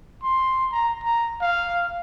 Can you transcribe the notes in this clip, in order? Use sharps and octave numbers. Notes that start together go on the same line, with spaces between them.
C6
A#5
A#5
F5